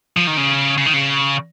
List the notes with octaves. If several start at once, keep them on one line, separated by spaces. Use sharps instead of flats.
F3
D#3
C#3
C#3
D#3
C#3